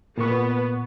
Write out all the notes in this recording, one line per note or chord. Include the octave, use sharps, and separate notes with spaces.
A#2 B3 C#6